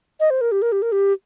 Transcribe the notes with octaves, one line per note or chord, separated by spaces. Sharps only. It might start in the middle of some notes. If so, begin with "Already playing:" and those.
D#5
C5
A#4
G4
A#4
G4
A#4
G4